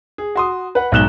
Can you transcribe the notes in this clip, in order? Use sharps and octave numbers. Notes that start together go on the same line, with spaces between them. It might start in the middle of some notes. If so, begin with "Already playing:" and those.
G#4
F#4 C6 D#6
B4 F#5
B1 G#2 F#6 E7 G7